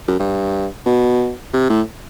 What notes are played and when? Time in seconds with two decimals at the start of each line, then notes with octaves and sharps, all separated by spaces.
0.08 F#2
0.20 G2
0.86 B2
1.53 C3
1.70 A2